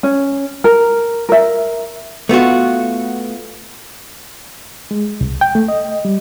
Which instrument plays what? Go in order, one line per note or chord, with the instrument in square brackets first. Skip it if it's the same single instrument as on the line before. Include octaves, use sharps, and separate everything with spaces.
[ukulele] C#4
A#4
A#4 E5
[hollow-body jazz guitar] A3 B3 F4 F#4
[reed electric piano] G#3
C2
G5
A3
D#5
G3